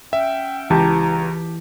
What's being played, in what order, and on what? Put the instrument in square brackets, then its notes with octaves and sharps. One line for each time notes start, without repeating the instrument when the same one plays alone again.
[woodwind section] C#4 F#5 G5 [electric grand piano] E5
[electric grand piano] C#2 [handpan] E3 [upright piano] G4 A5 [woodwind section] A#5